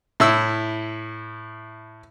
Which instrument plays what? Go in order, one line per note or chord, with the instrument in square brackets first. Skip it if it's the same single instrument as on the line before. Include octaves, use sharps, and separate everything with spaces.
[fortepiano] A2 E4 E6